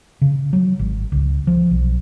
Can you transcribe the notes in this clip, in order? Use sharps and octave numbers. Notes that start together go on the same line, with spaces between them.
C#3
F#3
G#1
C#2
F3
B1